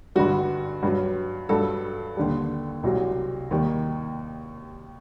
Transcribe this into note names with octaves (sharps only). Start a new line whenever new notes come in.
G2 D3 G3 F#4
G2 F#3
G2 F#3 A4
D#2 D3 G3
C2 C3 F#3
D#2 D#3 G3